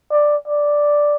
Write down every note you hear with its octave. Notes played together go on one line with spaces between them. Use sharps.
D5
D5